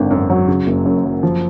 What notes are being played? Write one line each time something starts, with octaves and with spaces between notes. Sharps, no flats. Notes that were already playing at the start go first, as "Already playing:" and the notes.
Already playing: G#1 D3
F#2
F#3
C#3
F#1
F#2
F#3
F3